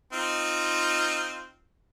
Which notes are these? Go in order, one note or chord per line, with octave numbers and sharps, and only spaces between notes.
C4 D#4 F4